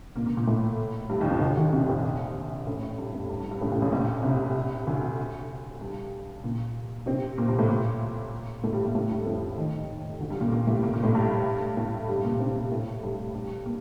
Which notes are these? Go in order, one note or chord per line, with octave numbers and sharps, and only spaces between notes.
A#2 A#3
A#2 A#3
A#2 A#3
A2 A3
G2 G3
D#2 D#3
F2 F3
D2 D3
D#2 D#3
C2 C3
A#1 A#2
A1 A2
G2
F2
G2
G2
G2
A1 A2
A1 A2
A1 A2
A#1 A#2
C2 C3
D2 D3
G2 G3
A#2 A#3
C3 C4
A#2 A#3
G2 G3
A2 A3
A#2 A#3
A2 A3
G2 G3
A#3
A2 A3
G2 G3
F2 F3
D#2 D#3
D2 D3
G2 G3
A#2 A#3
A#2 A#3
A2 A3
A#2 A#3
A#2 A#3
A2 A3
G2 G3
A2 A3
G2 G3
A#2 A#3
C3 C4
A#2 A#3
A2 A3
G2 G3
G2 G3
A#3